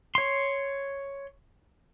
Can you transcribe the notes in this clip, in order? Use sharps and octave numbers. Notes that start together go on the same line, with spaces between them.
C#5 C6